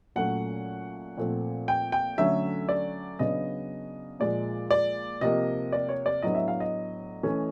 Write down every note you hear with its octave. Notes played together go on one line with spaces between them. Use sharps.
A#2 F#3 A3 C#4 F#5
A#2 F3 A3 C4
G5
G5
D3 F#3 A3 C#4 E5
D5
C#3 F#3 B3 D4 D#5
A#2 F3 G#3 D5
D5
C3 F3 A#3 D#5
D5
C#5
D5
A2 F#3 B3 D4 D#5
E5
F5
D#5
E3 A3 C#4